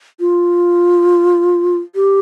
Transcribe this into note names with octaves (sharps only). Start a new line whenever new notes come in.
F4
G4